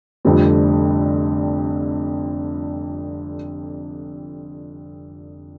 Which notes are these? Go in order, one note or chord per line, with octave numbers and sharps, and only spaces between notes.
F1 F2 D3 G3 C4